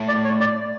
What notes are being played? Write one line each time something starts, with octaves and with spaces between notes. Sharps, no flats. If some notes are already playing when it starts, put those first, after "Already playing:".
Already playing: A2
D5
C#5
D5